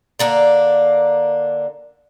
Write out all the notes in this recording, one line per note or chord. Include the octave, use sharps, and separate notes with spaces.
D3 A#3 D4